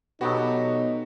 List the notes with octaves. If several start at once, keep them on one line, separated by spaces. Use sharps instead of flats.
B2 F#3 B3 D#4 F#4 G4 A4